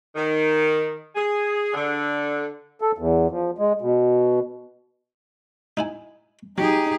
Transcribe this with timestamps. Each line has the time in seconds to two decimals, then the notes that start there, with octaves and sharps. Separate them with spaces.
0.16 D#3
1.16 G#4
1.74 D3
2.81 A4
2.98 E2
3.31 F3
3.58 G#3
3.81 B2
5.77 D#4 E4 G#5
6.58 F#3 D#4 G4 G#4